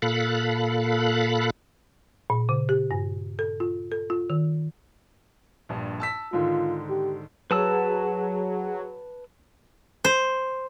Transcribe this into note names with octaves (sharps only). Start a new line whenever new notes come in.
A#2 A4 F5 B5 F#6
A#2
C#3
G4
G2
A4
F4
A4
F4
D#3
A#1 G2
A5 E6 B6
G#2 D3 D#3 F4
G4
F#3 G#4 B4 A5 E6
C5